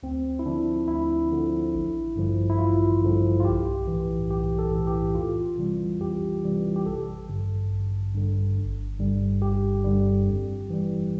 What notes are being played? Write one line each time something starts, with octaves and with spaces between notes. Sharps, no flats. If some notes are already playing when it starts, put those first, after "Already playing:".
D2 C4
E4
D3 F3 D4
D2 E4
D3 F3
A1
G2 D3 F3
E4
A1 F4
G2 D3 F3
F4
B1 G4
A2 E3
B1 G4
A4
A2 E3
G4
F2 F4
C3 E3 G3
F2 G4
C3 E3 G3
G4
A1 A4
G2 D3
A1
G2 D3
G1
G2 D3 G3
G1 G4
G2 D3 G3
F2
E3 G3